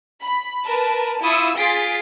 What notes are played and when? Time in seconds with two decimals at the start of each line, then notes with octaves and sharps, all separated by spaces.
0.23 B5
0.66 A#4 B4 A5
1.23 E4 F4 C#6 D#6 E6
1.58 F4 G#4 A6 B6 C7 D7